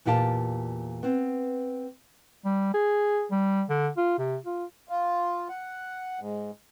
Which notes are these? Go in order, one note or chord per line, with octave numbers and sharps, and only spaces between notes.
E2 A#2 F4 G4 F5 A5
B3 C4
G3
G#4
G3
D3
F4
C3
F4
F4
F#5
G#2